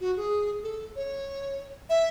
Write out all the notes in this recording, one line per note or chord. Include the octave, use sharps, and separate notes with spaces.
F#4
G#4
A4
C#5
E5